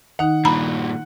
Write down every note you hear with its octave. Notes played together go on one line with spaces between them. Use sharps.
D#3 D#4 F#5
G2 A#2 A#5 B5